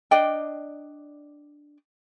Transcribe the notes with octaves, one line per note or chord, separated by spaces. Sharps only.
D4 D5 D#5 G5